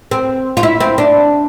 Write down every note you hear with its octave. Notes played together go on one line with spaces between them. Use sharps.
C4
F4
E4
C4
D4